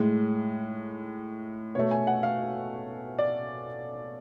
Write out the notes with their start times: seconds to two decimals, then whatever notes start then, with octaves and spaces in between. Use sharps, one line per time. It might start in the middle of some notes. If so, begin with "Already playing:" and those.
Already playing: A2 G#3
1.75 B2 A3 C#5
1.91 G#5
2.07 F#5
2.23 F5
3.19 D5